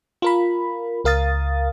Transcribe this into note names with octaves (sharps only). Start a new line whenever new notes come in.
F4 A#4 B5
C#2 A#4 F5 D#6 A6